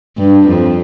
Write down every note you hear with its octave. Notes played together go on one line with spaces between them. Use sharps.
G2
F2